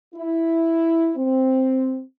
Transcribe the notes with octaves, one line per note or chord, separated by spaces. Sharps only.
E4
C4